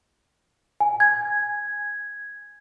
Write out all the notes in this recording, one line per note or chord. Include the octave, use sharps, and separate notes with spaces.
G#5
G#6